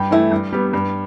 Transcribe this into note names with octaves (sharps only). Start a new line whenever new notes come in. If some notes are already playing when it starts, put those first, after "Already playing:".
Already playing: G2 G5
E3 A3 E4
G2
G3 B3
G2